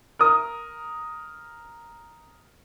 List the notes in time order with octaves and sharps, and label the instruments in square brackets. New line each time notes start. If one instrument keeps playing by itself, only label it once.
[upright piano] A#4 D#6